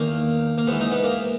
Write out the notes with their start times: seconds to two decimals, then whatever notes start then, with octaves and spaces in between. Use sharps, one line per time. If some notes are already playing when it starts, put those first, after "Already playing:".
Already playing: E2 D#3 A#3
0.58 A#3
0.67 G#2 E3 B3
0.80 D#4
0.92 B3
1.04 A#3